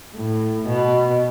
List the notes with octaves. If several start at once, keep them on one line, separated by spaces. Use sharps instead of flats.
A2
B2